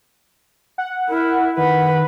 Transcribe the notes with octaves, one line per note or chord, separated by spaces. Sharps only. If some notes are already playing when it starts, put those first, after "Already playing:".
F#5
E4 A#4
D#3 B4 F#5